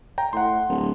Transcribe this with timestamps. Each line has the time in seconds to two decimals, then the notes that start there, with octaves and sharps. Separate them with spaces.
0.18 G5 A#5
0.33 A2 F#5 C6
0.69 D1